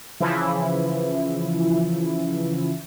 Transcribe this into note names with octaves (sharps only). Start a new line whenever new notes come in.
C#3 E3 F3 E4